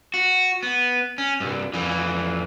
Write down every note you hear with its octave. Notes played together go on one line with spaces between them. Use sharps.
F#4
B3
C#4
C2 G2
F2 E3